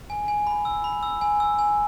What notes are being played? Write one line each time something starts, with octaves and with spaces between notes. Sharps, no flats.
G#5
G#5
B5
E6
B5
E6
G#5
E6
G#5